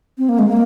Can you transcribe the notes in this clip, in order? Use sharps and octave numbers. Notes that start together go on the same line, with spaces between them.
C4
A#3
G#3
A#3